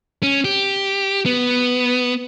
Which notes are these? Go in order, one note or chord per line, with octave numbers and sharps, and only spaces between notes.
C#4
G4
B3